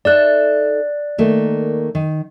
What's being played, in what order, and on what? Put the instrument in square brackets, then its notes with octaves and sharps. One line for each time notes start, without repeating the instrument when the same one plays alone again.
[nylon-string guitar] D#4 A4 E5 [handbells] D5 F#6
[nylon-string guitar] D#3 A3 A#3
D#3